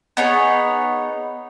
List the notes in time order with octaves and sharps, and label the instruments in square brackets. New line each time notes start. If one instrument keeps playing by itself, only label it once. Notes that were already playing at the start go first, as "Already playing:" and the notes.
[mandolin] B3 D#4 G#4 C#5